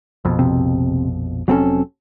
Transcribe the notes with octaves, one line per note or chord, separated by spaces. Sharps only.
A#1 F2 B2
C3
F1 F#3 C4 C#4 A4